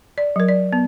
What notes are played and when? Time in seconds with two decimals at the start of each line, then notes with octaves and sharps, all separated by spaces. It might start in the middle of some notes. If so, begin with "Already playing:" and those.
0.18 D5
0.36 F#3 A#4
0.48 D5
0.73 B3